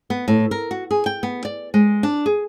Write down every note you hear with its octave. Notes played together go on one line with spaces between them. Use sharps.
B3
A2
A#4
F#4
G#4
G5
B3
D5
G#3
D4
G#4